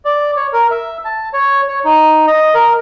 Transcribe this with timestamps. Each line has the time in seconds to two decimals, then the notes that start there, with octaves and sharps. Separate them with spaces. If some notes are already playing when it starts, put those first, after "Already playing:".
0.05 D5
0.36 C#5
0.53 A#4
0.71 E5
1.05 A5
1.33 C#5
1.68 C#5
1.85 D#4
2.27 D#5
2.54 A#4